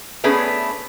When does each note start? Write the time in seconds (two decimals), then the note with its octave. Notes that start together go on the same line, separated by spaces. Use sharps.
0.24 A3 B3 C#4 D4 G#4 B4